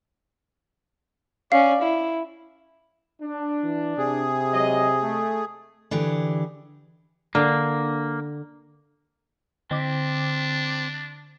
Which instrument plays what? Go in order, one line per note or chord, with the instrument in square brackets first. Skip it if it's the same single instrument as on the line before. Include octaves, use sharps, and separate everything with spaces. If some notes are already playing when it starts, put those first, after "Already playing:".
[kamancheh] C#4 D5 [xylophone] F5
[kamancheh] E4
[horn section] D4
[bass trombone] E3
[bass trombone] C3 [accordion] G#4
[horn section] F#3 G#3 D#5
A3
[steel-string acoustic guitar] D3 E3 G4 G#4
[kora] D3 [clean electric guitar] A#3
[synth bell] D3 D6 B6 [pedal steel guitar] C4 [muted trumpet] D4